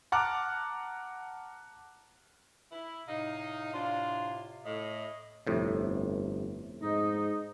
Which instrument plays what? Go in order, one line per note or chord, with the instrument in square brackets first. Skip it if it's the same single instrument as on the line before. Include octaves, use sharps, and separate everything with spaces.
[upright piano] F#5 A5 A#5 D6 F6 F#6
[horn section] E4
[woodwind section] A2 C3 F5 [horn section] D#4
[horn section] D4 F4 C5
[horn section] A2 [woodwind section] D#5
[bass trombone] G1 [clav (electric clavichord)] F2 A2 C3
[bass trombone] G#2 [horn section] D#4